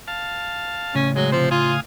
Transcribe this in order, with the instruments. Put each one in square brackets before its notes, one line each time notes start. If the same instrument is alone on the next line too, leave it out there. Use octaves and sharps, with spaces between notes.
[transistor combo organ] F5 A5
[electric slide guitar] A2 C#3 [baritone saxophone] C#4
[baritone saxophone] F#3 [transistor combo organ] G#3
[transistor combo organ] C3 C5 [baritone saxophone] F3
[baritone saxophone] F4 [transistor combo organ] F5 G#5 D#6